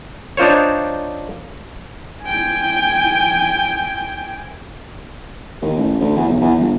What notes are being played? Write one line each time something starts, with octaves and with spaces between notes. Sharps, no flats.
D4 D#4 F4 C5 C#5
G5 G#5
D#2
A1
D2
E2
B1
E2
G1